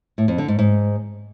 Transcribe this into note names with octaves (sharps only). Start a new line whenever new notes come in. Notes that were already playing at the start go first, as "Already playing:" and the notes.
A2
F2
D3
G#2
G#2